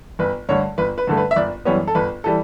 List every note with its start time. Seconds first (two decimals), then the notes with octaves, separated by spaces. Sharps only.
0.19 G1 B4
0.49 G2 D3 A3 C#5
0.78 G1 B4
0.98 B4
1.07 G2 D3 A3
1.17 B4
1.31 E5
1.36 G1 D5
1.65 F#2 E3 G3 B3 C#5
1.87 A4
1.95 G1 B4
2.24 E3 G3 A4